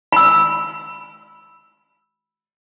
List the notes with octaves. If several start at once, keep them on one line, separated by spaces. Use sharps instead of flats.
B5 E6